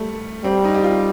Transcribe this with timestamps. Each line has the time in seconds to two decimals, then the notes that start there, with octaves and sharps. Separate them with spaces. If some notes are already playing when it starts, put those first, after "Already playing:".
Already playing: G3 A3
0.44 G3 C4
0.64 D#4
0.75 G4
0.84 F4